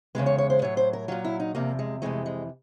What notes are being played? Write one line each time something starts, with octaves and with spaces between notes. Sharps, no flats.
E2 C#3 E3 G#3 B4
C#5
C#5
C5
A2 F#3 C#5
C5
A#4
A#2 F#3 F4
E4
D#4
E2 C3 F3 A#3
G#3
F2 C3 E3 G#3 A3
G#3